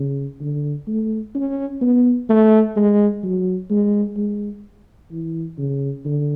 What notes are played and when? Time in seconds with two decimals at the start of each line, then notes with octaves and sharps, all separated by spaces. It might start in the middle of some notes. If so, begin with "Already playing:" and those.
Already playing: C#3
0.41 D3
0.87 A3
1.35 C#4
1.81 B3
2.29 A3
2.76 G#3
3.24 F#3
3.71 G#3
4.17 G#3
5.11 E3
5.58 C#3
6.05 D3